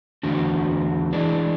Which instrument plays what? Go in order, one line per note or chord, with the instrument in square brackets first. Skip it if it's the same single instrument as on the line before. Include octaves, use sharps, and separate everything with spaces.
[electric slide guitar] E2 D3 A3 D4 F#4
E3 G#3 D4